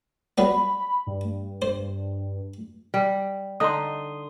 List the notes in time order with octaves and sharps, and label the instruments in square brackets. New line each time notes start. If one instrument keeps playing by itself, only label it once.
[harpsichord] F#3 G3 B3 [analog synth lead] B5
[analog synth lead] G2
[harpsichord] C5
[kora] G3
[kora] D3 D#4 [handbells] C6 D#6